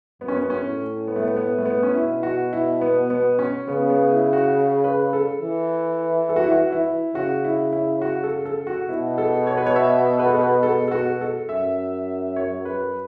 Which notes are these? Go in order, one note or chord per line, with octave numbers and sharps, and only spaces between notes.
F#2 B3
C#4
B3
C#4
A2
B3
A3
B3
B3
A3
B3
C#4
B2 E4
F#4
E4
B3
B3
C#4
C#3 B3
B3
E4
F#4
B4
A4
E3
A4
F#4
E4
F#4
E4
C#3 F#4
E4
E4
F#4
A4
A4
F#4
B2 E4
A4
C#5
B4
C#5
E5
B4
A4
B4
A4
A4
F#4
A4
F#2 E5
C#5
B4